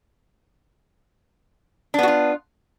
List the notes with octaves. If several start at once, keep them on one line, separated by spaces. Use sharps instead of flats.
B3 D4 F4 F#4